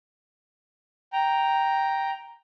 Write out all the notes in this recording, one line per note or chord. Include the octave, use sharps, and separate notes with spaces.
G5 A#5